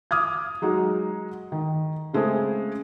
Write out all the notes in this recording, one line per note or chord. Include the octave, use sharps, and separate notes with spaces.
D6 D#6 F6 G#6
F#3 G#3 D#4 F#4
D#3
C#3 G#3 A3 C4 G#4